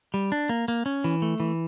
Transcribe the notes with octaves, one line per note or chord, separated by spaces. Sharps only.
G3
D4
A#3
A#3
C#4
E3
A3
E3